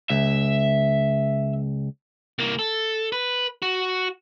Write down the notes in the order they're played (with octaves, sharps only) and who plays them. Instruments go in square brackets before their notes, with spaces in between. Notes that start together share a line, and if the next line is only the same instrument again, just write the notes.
[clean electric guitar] C#2 [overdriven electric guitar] E5
[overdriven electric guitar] C2 A#3
A4
B4
F#4